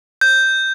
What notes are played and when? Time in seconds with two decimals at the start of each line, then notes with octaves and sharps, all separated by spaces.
0.21 G6